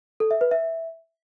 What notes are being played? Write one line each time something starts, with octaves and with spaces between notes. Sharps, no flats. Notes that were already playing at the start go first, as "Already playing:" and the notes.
A4
E5
B4
E5